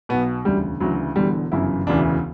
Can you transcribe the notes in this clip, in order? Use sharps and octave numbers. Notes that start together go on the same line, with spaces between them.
B1 B2 B3
E1 D2 C#3 G3
D2 C#3 E3 F#3
E1 E2 D3 G3
G1 F#2 C#3 E3 E4
E1 D2 C#3 E3 D4